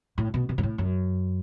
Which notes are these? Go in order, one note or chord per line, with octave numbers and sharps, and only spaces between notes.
A2
B2
B2
G#2
A2
F#2